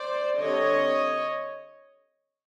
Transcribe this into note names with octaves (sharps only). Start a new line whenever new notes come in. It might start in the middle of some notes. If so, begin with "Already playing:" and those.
Already playing: C5 D5
D3 G3 C4 C#5 D#5